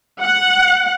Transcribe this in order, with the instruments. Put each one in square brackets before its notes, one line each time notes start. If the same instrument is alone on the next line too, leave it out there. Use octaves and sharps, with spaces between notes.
[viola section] F#5